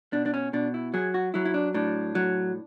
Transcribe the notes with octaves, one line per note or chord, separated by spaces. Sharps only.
B2 D4
D4
C#4
B2 D4
E4
F#3 G#4
F#4
F#3 E4
E4
D4
A2 D4
F#3